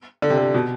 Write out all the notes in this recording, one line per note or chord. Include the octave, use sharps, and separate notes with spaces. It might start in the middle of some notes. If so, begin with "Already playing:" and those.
D3
C3
D3
B2